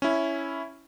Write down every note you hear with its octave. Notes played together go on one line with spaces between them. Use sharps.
C#4 E4